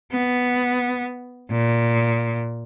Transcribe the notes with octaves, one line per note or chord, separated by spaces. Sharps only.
B3
A#2